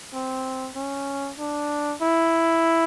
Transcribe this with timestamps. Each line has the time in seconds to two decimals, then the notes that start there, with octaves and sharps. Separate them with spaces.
0.14 C4
0.75 C#4
1.39 D4
2.01 E4